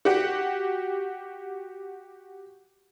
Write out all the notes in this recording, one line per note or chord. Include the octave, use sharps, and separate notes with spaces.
F#4 G4